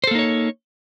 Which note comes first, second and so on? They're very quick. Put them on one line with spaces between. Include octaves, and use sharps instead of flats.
C5 A4 A#3 D#4 C#5